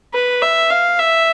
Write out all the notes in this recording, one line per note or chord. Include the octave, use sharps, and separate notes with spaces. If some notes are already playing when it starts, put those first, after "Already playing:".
B4
E5
F5
E5